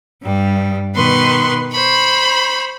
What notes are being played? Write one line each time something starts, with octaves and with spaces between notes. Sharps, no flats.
G2 G3
B2 D#3 B4 C6 C#6
C5 B5 C#6